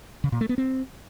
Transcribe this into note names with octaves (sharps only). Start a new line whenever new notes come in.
C#3
A#2
A3
B3
C4